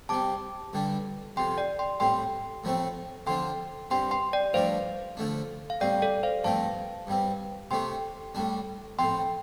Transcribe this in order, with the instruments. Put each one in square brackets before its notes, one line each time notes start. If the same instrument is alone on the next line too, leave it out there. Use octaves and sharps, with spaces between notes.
[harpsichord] C3 G3 C4 [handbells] A5 D6
[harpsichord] G2 D3 G3 D4
[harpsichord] F2 C3 F3 [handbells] G5 C6
[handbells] D5 G5
G5 C6
[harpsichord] A2 G3 C4 [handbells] G5 C6
[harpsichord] A2 F3 A3 C4
[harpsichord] D3 F3 D4 [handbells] G5 C6
[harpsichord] G2 G3 C4 [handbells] G5 C6
[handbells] G5 C6
D5 G5
[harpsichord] G2 F3 A3 D4 [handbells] C5 F5
[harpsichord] D3 F3 A3 D4
[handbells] F5
[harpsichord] A2 G3 C4 [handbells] D5 G5
[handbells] A4 D5
C5 F5
[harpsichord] G2 F3 A3 C4 [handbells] F5 A5
[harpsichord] G2 G3 C4
[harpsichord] C3 A3 D4 [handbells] G5 C6
[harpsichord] A2 G3 D4
[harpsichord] A2 F3 C4 [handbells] G5 C6